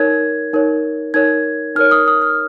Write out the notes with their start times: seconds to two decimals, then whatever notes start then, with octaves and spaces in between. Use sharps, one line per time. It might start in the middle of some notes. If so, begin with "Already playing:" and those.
Already playing: D#4 A#4 C#5 G#6
0.53 D#4 A#4 C#5
1.14 D#4 A#4 C#5 G#6
1.76 D#4 A#4 C#5 F6
1.91 D#6
2.08 D#6
2.22 F6